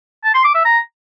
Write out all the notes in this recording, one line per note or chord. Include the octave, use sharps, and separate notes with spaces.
A5
C6
D6
E5
A#5